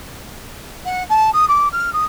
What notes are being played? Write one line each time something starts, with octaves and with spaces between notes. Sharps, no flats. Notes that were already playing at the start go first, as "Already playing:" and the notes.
F#5
A5
D#6
D6
F6
D#6